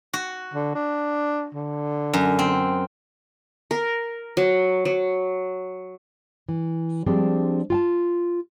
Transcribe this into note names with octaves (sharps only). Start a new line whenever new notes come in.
F#4
D3
D4
D3
F#2
C4
A#4
F#3
F#3
E3
F3 G3 G#3 C4 D4
F4 G5 A5